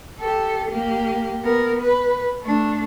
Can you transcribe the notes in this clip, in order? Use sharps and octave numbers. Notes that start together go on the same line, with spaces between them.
G4 A4
A#3 G4
B3 A#4
B4
A3 D4